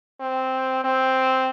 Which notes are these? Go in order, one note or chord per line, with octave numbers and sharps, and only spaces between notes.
C4
C4